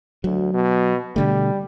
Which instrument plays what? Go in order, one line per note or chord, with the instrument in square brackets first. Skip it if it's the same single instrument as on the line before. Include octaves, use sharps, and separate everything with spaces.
[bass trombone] D2 [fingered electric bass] F#3
[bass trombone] B2
[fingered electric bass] B2 D3 A3 [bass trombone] G3